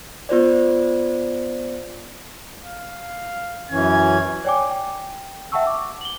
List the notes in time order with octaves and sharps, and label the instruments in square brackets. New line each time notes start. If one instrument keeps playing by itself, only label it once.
[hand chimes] B3 F4 C5 D5
[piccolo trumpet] F5
[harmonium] F#2 E3 C#4 [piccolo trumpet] G#6
[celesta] C#5 D5 G5 G#5 D6
G5
E5 F#5 G5 A5 C#6 E6
D6
F#7 G7